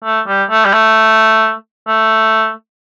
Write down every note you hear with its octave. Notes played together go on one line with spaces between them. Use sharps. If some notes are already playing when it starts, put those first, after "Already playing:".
A3
G3
A3
G3
A3
A3